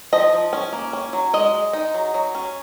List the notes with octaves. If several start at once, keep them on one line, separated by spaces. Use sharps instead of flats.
F3 D#5
F3
C#4
A#3
C#4
F#3
G#3 D#5
G#3
D#4
F#3
F#3
C#4